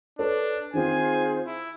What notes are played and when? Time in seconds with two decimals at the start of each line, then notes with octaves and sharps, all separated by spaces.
0.19 D4 A4 B4 C#5
0.74 D#3 C4 F4 G#4 C5 G#5
1.46 E4